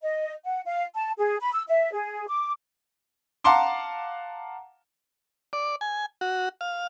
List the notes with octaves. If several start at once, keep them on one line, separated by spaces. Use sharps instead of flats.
D#5
F#5
F5
A5
G#4
B5
E6
E5
G#4
D6
F5 F#5 A5 A#5 C6 D6
D5
G#5
F#4
F5